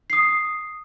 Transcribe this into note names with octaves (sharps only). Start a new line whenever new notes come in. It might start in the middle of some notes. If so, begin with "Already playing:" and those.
D#6 C7